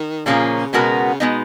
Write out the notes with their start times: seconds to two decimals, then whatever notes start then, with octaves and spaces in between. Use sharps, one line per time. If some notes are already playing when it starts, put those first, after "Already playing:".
Already playing: D#3
0.26 A#2 C#3 F3 A#3 C#4 G#4
0.73 B2 G#3 B3 F#4 A#4
1.20 B2 G#3 B3 D#4